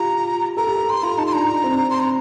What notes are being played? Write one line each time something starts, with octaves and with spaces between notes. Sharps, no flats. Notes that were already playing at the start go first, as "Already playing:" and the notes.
Already playing: F4 G4 A#5
A4 A#5
G4
A4
G4 C6
F4 A#5
D#4 A5
C6
D4 A#5
D4
C4
C6
A#5